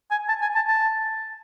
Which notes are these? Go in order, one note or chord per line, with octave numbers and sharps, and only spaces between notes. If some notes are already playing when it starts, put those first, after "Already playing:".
G#5
A5
G#5
A5
A5